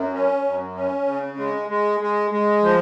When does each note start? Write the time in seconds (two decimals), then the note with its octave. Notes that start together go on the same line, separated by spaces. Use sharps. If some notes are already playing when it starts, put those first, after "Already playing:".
Already playing: F#2
0.13 C#4
0.44 F#2
0.75 C#4
1.06 C#3
1.37 G#3
1.68 G#3
2.00 G#3
2.31 G#3
2.62 F3